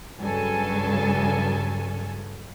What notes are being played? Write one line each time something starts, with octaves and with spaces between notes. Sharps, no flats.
G2 C#3 F#3 A4 G#5